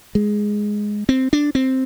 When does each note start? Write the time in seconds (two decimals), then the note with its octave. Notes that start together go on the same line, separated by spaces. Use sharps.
0.15 G#3
1.09 C4
1.33 D4
1.55 C4